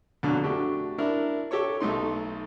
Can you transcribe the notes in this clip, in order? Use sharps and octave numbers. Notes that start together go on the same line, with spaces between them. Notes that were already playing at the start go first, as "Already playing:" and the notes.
F2 B2 D3 F#3
A3 D4 F#4 G4
D4 E4 A#4
G4 A4 C#5 C#6
B1 A3 D#4 C6